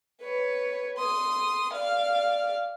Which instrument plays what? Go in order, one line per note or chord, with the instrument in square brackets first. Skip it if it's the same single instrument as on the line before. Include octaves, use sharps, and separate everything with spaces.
[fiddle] B4 C#5
C6 D#6
D5 F5